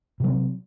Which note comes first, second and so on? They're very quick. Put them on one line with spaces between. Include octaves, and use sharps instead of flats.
C3 F#3 C4